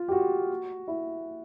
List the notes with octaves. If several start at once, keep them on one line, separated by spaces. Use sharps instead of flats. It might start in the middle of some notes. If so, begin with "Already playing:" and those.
Already playing: F4
G4
F#4
E4